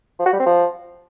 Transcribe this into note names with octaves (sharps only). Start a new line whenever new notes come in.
F3
F#4
G3
C4
F3